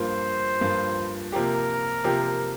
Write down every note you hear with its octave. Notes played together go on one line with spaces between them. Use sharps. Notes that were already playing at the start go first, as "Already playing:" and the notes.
Already playing: G2 F3 A#3 F4 C5
G2 F3 A#3 F4
C3 F3 A#3 G4 A#4
C3 F3 A#3 G4